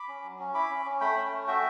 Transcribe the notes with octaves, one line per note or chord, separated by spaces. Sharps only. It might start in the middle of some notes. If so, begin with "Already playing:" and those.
Already playing: B5 D6
C#4
F#3
C#4
E4 B5 D6
C#4
C#4
A3 G5 B5
C#4
A3
F#4 E5 G5